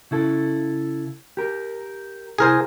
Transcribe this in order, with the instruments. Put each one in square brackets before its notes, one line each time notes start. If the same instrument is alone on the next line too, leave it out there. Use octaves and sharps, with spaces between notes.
[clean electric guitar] C#3 E4 A4
G4 A#4
[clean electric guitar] C2 E4 G#5 [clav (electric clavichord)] G#4 A#4 C5